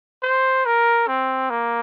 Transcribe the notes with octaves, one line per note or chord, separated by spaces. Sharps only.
C5
A#4
C4
A#3